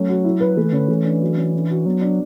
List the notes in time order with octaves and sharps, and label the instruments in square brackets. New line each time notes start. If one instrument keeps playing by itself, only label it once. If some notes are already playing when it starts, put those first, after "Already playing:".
Already playing: [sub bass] F#3 [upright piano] A3 C#4
[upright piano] F#4
E4
B4
[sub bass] E3 [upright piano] A3
[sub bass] D3 [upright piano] C#4
[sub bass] E3 [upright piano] A3
[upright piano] D4
F#3
C#4
D4
F#4
[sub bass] F#3 [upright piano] B3
[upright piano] D4